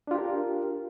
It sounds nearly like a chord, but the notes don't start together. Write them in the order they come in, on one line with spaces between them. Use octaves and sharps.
D4 F4 G4 A#4